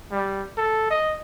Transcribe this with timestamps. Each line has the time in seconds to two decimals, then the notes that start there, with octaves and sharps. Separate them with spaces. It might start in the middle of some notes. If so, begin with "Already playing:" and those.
0.11 G3
0.57 A4
0.90 D#5